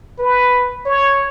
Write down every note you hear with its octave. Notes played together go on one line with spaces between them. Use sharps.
B4
C#5